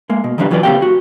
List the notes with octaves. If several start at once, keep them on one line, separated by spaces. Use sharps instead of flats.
G#3 A#3
B2
D#3 F3 G3 D4 A#4 B4
E3 F#3 F4 B4 D5
C#3 A#3 C4 G4 F5 G5
F#4